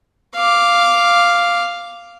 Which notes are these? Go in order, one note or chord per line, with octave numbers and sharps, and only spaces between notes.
F5 D6